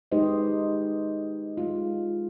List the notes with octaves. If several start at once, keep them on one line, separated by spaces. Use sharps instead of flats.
G#3 D#4 G4 B4 C5 D#5
G#3 F4